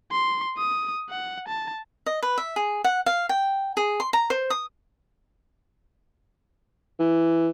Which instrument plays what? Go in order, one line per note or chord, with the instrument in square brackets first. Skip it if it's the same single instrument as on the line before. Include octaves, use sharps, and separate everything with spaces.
[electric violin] C6
D#6
F#5
A5
[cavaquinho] D#5
B4
E5
G#4
F#5
F5
G5
G#4
C6
A#5
C5
D#6
[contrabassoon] E3